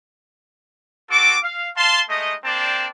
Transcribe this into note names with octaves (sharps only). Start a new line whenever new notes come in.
C4 F#4 A4 D6
F5
F5 A5 C6
G#3 A3 D#4 D#5
A#3 C4 D4 D5 G5 A5